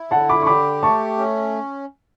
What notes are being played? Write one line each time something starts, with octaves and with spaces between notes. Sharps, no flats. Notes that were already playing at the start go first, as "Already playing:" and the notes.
Already playing: E4
D3 F#5 A5
B5 D6
C#6
G4 B5 D6
A3 A5 C#6
C#4